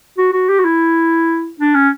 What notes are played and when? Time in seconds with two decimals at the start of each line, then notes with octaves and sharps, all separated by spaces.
0.18 F#4
0.33 F#4
0.49 G4
0.59 F#4
0.65 E4
1.60 D4
1.75 C#4